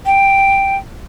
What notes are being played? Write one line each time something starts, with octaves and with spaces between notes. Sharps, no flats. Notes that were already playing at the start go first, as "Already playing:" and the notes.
G5